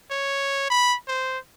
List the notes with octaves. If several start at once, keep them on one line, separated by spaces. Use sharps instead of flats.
C#5
B5
C5